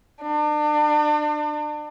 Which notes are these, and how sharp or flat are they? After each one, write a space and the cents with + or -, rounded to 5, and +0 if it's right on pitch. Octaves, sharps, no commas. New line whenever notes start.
D4 +35